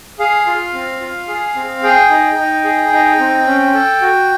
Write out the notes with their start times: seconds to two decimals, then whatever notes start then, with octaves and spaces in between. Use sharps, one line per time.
0.19 G#4 F5
0.47 F4
0.74 C4
1.01 F4
1.28 G#4
1.56 C4
1.83 G#4 G5
2.10 D#4
2.38 D#4
2.64 G#4
2.92 D#4
3.20 C4
3.46 C#4
3.74 A4
4.01 F#4